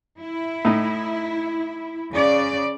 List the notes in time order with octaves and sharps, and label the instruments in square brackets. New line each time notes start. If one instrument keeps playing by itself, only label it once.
[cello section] E4
[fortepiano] A2 D#4
[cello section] C#3 D5